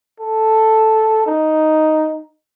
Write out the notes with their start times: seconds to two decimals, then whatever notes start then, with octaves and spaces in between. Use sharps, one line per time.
0.20 A4
1.26 D#4